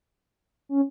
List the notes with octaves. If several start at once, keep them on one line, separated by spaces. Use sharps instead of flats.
C#4